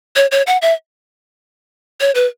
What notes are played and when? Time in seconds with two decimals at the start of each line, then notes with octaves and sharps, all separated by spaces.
0.16 C#5
0.32 C#5
0.47 F#5
0.62 E5
2.00 C#5
2.15 B4